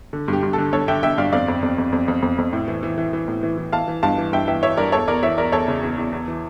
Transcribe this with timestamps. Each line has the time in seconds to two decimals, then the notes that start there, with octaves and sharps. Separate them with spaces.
0.13 D3
0.28 G2 G4
0.43 G2
0.53 A4
0.58 D3
0.73 G2 A4 C#5
0.88 D3 E5 G5
1.03 D3 E5 G5
1.18 G2 D5 F5
1.33 F2 D5 F5
1.48 F2
1.63 F2
1.78 F2
1.93 F2
2.08 F2
2.23 F2
2.38 F2
2.53 A2
2.68 E3
2.83 E3
2.98 E3
3.13 E3
3.28 A2
3.43 E3
3.58 E3
3.72 E3 F5 A5
3.88 E3
4.03 G2 F5 A5
4.18 E3
4.33 G2 E5 G5
4.48 E3 E5 G5
4.63 E3 C#5 E5
4.77 G2 A#4 D5
4.92 E2 A4 C#5
5.08 E2 A#4 D5
5.23 E3 C#5 E5
5.38 E2 A#4 D5
5.52 E2 A4 C#5
5.68 C#3
5.83 E2
5.98 E2
6.13 E2
6.28 E3